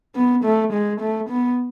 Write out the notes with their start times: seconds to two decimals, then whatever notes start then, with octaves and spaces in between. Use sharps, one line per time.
0.16 B3
0.44 A3
0.73 G#3
1.01 A3
1.30 B3